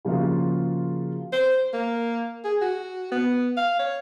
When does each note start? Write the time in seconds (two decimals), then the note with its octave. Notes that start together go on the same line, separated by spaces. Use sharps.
0.05 C#3 F3 A#3 F4 F#4
1.33 C5
1.73 A#3
2.44 G#4
2.61 F#4
3.12 B3
3.57 F5
3.79 C#5